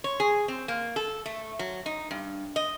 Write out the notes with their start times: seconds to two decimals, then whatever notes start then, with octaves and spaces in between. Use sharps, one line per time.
0.04 C#5
0.20 G#4
0.48 C4
0.68 A#3
0.96 A4
1.26 A3
1.59 F#3
1.86 D#4
2.11 G2
2.56 D#5